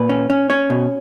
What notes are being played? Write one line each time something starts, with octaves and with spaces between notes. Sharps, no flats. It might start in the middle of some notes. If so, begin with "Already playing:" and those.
Already playing: A#2 B4
C#4
C#4
C#4 C#5
B2